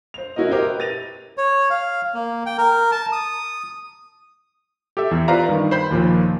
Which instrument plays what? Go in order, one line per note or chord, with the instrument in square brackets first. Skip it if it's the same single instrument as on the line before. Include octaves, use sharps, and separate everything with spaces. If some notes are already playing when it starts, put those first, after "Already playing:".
[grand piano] C5 F7
C#4 E4 F#4 A#4 D#5
F#4 G4 A#4 C5 D#5
B4
A6 A#6 D#7 F7
[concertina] C#5
F5
A#3
G5
A#4
A5
D#6
[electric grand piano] G4 A4 E5
E2
F4 B4 C5 D5 F5 A#5
G2 D#3
C5 B5 G6
D#2 A#2 F3